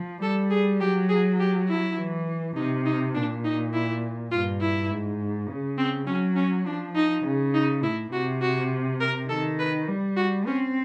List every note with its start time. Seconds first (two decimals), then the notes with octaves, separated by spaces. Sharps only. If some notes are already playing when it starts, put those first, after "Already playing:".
Already playing: F3
0.22 G3 A4
0.51 G#4
0.80 F#3 G4
1.09 G#4
1.40 G4
1.68 E4
1.97 E3
2.56 C3 D#4
2.86 D#4
3.15 A#2 D4
3.44 D#4
3.74 E4
4.31 G2 F4
4.61 E4
4.90 G#2
5.49 C#3
5.78 C4
6.07 F#3 C#4
6.36 C#4
6.66 F3 D4
6.95 D#4
7.25 C#3
7.54 D#4
7.83 A2 E4
8.13 C3 F#4
8.41 F#4
9.01 A#4
9.29 D#3 A4
9.59 B4
9.88 G3
10.17 F#4
10.46 C4 C#4